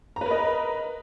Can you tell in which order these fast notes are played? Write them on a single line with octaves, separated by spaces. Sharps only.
A#5 B4 A#4 D#5